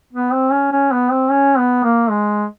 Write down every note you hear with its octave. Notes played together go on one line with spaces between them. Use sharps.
B3
C4
C#4
C#4
B3
C4
C#4
B3
A#3
G#3